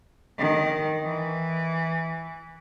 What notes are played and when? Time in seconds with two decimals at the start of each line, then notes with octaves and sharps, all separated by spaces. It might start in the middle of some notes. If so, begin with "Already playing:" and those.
0.38 D#3
1.04 E3